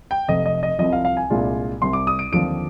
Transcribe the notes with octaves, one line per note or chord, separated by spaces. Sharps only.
G5
F1 F2 C3 D#5
D#5
D#5
C2 C3 F3 D#5
F5
F5
G#5
C2 A#2 G#3 D4 F4
C2 C3 G3 C6
D6
D#6
D7
D#2 D3 F3 C4 F4 D7